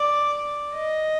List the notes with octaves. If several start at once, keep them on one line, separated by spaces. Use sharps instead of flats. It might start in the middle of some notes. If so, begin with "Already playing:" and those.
Already playing: D5
D#5